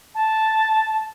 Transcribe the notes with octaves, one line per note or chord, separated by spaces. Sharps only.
A5